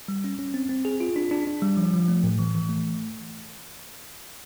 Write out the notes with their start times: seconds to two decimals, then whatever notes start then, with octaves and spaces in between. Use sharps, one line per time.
0.08 G3
0.24 C#4
0.39 C#4
0.54 C4
0.69 C4
0.85 G#4
1.00 F4
1.16 D4
1.31 D4
1.47 D4
1.62 G3
1.77 F3
1.93 F3
2.08 A3
2.23 A2
2.39 E3
2.55 E3
2.69 A3